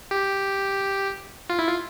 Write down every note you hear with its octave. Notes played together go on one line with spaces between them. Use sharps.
G4
F4
E4
F4